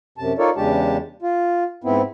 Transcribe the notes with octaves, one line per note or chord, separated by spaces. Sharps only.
F#2 C3 A5
D#4 F4 A4 A#4 C#5 D5
E2 C#3 G#3 D4 G4 A5
F4
G#2 B3 C4 E4